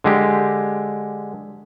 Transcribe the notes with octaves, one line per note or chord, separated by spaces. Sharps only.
D3 G#3 G4